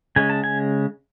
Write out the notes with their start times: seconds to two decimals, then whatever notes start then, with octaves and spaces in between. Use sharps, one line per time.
0.16 C#3 G#3 C#4 G#5
0.30 A5
0.44 G#5